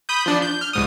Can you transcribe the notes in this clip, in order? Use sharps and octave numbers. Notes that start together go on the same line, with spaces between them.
B5 D#6 G6
F3 D4
G6
F6
C2 G#2 D#6